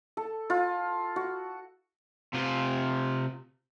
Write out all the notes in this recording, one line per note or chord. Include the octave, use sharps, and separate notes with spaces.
A4
F4
F#4
C3 F4